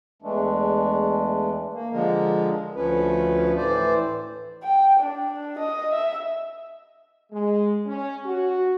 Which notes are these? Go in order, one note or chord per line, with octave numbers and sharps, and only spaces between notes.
E2 E3 G#3 A3 D4
A#3
D3 F3 G#3 A#4
D2 F3 C#4 B4
A2 E3 C5 D5
G5
D4
D#5
E5
G#3
C#4
F#4